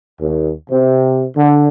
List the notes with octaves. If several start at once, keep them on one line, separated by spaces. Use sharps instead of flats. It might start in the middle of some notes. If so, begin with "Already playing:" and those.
D#2
C3
D3